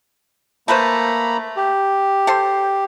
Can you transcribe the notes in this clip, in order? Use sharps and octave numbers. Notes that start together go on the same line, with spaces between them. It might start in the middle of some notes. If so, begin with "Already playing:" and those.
A3 A#3 B4 C5 A#5 B5
G4
A4 C5 C6